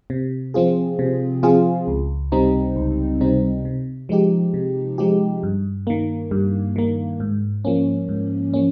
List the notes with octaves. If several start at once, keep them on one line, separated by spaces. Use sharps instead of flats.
C3
F3 C4 F4 G#4
C3
F3 C4 F4 G#4
C#2
C3 G3 C4 D#4
C#2
C3 G3 C4 D#4
C3
F3 G#3 D#4 G4
C3
F3 G#3 D#4 G4
G2
D#3 A#3
G2
D#3 A#3
G#2
F3 A#3 C#4
G#2
F3 A#3 C#4